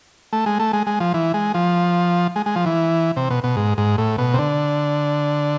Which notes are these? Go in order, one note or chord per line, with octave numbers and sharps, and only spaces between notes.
A3
G#3
A3
G#3
G#3
F3
E3
G#3
F3
G#3
G#3
F3
E3
C3
B2
B2
G#2
G#2
A2
B2
C3
D3